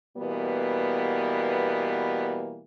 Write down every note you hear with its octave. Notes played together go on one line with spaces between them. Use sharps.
B2 E3 G3 A#3 B3